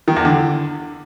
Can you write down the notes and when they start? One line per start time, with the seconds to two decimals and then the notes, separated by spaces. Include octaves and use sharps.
0.08 D#3
0.16 E2
0.25 D3